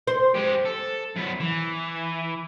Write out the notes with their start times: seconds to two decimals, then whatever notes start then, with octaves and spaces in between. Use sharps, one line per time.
0.07 C5
0.35 G#3 G4
0.66 A4
1.16 F#2 B3
1.40 E3